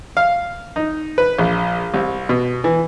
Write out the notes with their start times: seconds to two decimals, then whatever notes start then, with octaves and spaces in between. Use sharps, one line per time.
0.17 F5
0.76 D#4
1.18 B4
1.39 A#1
1.94 C2
2.29 B2
2.64 E3